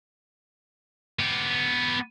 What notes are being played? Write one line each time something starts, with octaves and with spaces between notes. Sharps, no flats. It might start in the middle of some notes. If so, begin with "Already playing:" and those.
B3 G4